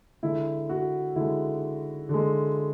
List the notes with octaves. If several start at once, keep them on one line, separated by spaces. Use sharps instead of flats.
D3 G#3 E4
F#4
D3 G#3 E4
D3 G#3